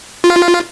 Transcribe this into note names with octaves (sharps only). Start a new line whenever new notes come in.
F4